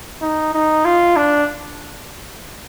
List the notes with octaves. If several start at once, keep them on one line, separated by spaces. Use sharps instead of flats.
D#4
D#4
F4
D4